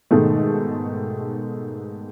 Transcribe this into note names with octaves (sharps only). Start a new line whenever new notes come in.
G#2 B2 D#3 G#3 A3